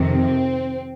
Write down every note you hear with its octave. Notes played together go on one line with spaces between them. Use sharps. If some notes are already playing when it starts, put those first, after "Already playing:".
Already playing: F2 C3 D#3
C4